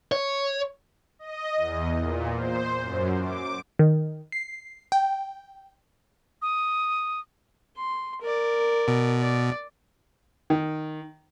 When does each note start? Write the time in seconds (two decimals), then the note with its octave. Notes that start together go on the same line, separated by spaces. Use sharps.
0.12 C#5
1.19 D#5
1.57 E2
1.98 A#2
2.36 C5
2.81 F#2
3.22 D6
3.79 D#3
4.32 C7
4.92 G5
6.42 D#6
7.77 C6
8.21 A#4 D5
8.88 B2
9.21 D5
10.50 D#3